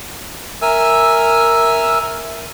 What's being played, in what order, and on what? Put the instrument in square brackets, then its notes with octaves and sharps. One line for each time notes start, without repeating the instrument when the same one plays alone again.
[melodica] A#4 E5 G#5 E6